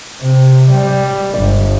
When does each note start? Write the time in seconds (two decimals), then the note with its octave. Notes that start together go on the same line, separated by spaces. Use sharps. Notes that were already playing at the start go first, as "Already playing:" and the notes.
0.21 C3
0.71 G3
1.39 G1